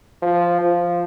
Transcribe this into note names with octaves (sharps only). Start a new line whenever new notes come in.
F3
F3